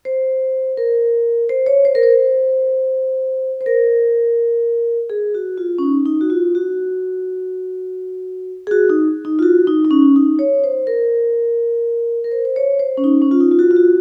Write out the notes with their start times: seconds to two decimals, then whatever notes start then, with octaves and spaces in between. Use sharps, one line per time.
0.05 C5
0.77 A#4
1.49 C5
1.66 C#5
1.85 C5
1.95 A#4
2.03 C5
3.61 C5
3.66 A#4
5.10 G#4
5.35 F#4
5.58 F4
5.78 C#4
5.83 D#4
6.06 D#4
6.21 F#4
6.30 F4
6.55 F#4
8.67 G#4
8.71 F#4
8.89 D#4
9.25 D#4
9.39 F4
9.43 F#4
9.67 D#4
9.85 D#4
9.91 C#4
10.16 D#4
10.39 C#5
10.64 C5
10.87 A#4
12.24 A#4
12.31 C5
12.45 C5
12.56 C#5
12.80 C5
12.97 C#4
13.04 D#4
13.22 C#4
13.31 F4
13.40 D#4
13.51 F4
13.59 F#4
13.71 F4
13.77 F#4